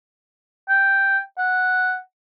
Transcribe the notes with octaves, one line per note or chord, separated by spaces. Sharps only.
G5
F#5